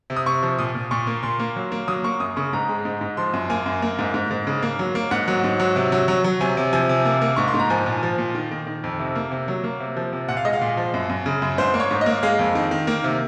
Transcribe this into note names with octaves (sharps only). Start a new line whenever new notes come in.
C3
D#6
C3 C#6
F3
A#2 D#6
A#2
A#2 C#6
A#3
A#2 C6
A#3
F#3
A#3
F#3 D#6
A#3 C#6
F#2 D#6
C#3 C#6
G#2 A#5
G#3
G#2
G#2
F3 C6
F#2
A#3 G#5
F#2
A#3
G#2
G#2
G#2
C#3
A#3
F#3
A#3
G#2 F#5
F#3
G#2
F#3
C3
F#3
F#3
F#3
C3 G#5
C3
F3 G#5
C3
A#3
A#3
G#2 C#6
C6
G#2
A#5
F3 G#5
A#2
F3
A#2
D#3
D#3
D#3
F2
C3
A#3
C3
F#3
A#3
C3
F3
C3
A#2 F#5
F5
G#3 D#5
F5
A#2
F3
F#2
F#2
C#3
F#2
G#2 C5
A#3
C#5
G#2
A#3 D#5
G#3 F5
F2
D#3
D#3
A#3
C3